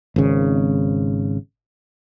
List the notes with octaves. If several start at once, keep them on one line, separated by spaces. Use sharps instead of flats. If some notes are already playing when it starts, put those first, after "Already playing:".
G#1 C#3